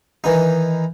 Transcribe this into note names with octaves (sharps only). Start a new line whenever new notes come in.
D#3 E3 D#4